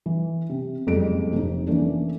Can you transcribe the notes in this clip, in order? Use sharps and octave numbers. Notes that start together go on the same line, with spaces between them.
E3
C3
F#1 F2 G#2 G3 D7
F1 D#4
E3 A3 A#3 C#4 D4 E4